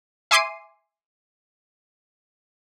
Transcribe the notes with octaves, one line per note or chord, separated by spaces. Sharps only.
E5 G#5 C6 D6 C7 D#7